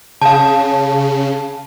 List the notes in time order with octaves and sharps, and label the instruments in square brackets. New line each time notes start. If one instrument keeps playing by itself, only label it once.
[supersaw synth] C#3 [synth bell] F5 A5